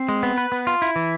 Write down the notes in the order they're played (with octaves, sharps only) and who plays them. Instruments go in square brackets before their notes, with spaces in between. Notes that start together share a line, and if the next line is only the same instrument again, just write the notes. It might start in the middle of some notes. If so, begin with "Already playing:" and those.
Already playing: [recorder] C4
[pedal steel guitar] G#3
B3
B4
B3
F4
E4
E3